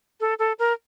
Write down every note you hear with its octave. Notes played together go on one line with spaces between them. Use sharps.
A4
A4
A#4